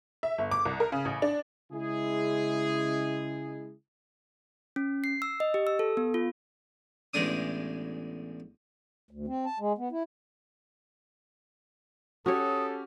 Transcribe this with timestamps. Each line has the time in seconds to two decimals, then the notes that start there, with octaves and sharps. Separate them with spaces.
0.23 E5
0.38 G1
0.51 D6
0.65 C2
0.80 A#4
0.92 C#3
1.05 A1
1.22 D4
1.72 C#3 G#3 E4 G#4
4.76 C#4
5.04 C7
5.22 E6
5.40 D#5
5.54 G4
5.67 E6
5.79 A4
5.97 B3
6.14 F4
7.14 A1 E2 A2 G#3 D4 D#6
9.11 D2
9.28 C4
9.46 A5
9.60 G#3
9.78 B3
9.92 E4
12.26 C#4 F#4 G4 A4 C#5 D#6